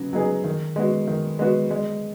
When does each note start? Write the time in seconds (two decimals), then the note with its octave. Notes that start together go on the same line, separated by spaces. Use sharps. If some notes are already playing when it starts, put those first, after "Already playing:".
Already playing: C#3 F#3 B3 D#4
0.13 F#3 B3 D#4 G#4
0.44 D#3
0.76 G#3 B3 F#4
1.08 D#3
1.39 G#3 B3 F#4
1.71 G#3